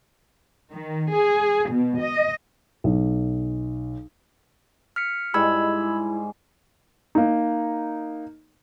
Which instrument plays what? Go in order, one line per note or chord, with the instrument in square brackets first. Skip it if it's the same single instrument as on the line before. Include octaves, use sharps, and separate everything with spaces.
[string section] D#3
G#4
B2
D#5
[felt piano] B1
[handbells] F6 B6 C#7
[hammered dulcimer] G#2 G3 G#3 [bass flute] E4 [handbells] B5 E6 G#6
[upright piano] A#3 D#4